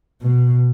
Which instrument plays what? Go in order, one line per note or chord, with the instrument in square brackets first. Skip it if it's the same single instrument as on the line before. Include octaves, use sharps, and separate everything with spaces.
[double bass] B2